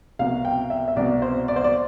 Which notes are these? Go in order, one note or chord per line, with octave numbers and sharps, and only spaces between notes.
C2 B2 F5
G5
E5
E5
C2 B2 D5
C5
D5
C5
D5